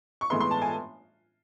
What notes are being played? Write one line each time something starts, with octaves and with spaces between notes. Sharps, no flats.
C#6
A2 E3 G#3 B3 C6
C6
A5
G#5